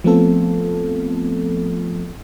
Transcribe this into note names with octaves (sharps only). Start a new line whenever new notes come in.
F3 A3 B3 C4 F4 A4